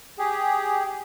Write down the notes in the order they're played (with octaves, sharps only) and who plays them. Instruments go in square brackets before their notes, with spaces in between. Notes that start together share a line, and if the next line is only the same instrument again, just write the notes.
[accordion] G4 G#4